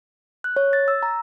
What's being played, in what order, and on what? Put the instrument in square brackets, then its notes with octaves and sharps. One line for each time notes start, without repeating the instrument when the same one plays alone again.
[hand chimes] F#6
C#5
A6
E6
A#5